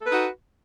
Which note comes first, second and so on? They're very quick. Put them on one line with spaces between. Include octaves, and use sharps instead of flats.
A4 B4 D#4 F#4